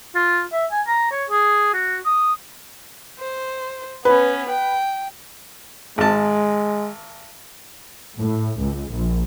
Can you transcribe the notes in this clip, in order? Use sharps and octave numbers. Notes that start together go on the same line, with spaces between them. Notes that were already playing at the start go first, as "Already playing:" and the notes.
F4
E5
G#5
A#5
C#5
G#4
F#4
D#6
C5
B3 C#4 B4
G5
G#1 G#3 A5
A2
C#2
A#1